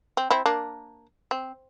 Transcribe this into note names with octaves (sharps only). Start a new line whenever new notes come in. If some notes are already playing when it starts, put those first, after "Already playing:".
C4
C4 E4
A#3 D4
C4